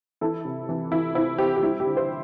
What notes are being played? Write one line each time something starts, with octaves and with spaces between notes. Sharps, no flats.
E3 E4 A4
C3
E3
E3 E4
C4 E4
C4 G4
G4
G3 E4
G4
D3
G4 C5